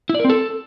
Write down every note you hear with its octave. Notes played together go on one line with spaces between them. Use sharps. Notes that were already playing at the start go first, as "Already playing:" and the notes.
E4
D5
A#4
C4
A4